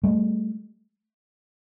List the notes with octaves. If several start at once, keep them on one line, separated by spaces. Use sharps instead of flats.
G3 A3